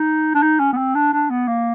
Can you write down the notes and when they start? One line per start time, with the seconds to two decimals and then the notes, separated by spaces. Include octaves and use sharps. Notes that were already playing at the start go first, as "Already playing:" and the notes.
Already playing: D#4
0.34 D4
0.42 D#4
0.59 C#4
0.73 B3
0.77 C4
0.95 D4
1.13 D4
1.30 B3
1.48 A#3